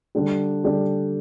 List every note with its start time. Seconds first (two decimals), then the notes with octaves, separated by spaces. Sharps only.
0.15 D3 G3 D4 G4
0.64 D3 G3 D4 G4